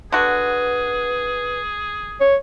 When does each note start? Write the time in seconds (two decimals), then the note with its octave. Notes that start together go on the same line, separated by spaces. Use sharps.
0.12 D3 F#4 G#4 B4
2.21 C#5